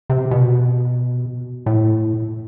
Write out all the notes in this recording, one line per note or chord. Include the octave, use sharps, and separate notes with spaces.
C3
B2
A2